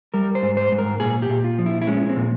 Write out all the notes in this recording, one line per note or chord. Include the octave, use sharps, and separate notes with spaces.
G3 A#4
C5
G#2
C5
G#2
A#4
A#2 G#4
G4
A#2
F4
F3
E4
E4
G#3 C#4
C4
A#2